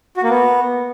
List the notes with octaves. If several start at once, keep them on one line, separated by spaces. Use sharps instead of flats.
F#4
A#3
B3